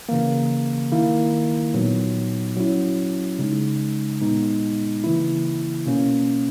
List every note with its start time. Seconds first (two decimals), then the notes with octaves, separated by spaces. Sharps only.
0.09 C#3 E3 A#3
0.92 D#3 A#3 E4
1.74 A#2 F#3 B3 D#4
2.56 F#3 C#4 E4
3.39 C#3 G#3 D#4
4.21 A#2 G#3 B3 D#4
5.04 C#3 E3 A#3 E4
5.86 B2 A#3 C#4